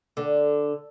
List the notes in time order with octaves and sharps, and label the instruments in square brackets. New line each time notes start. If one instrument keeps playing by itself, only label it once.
[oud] D3